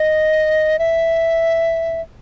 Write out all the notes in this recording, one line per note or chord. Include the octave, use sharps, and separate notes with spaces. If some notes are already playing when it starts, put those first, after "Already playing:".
Already playing: D#5
E5